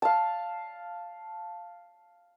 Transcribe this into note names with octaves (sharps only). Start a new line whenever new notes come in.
F5 A5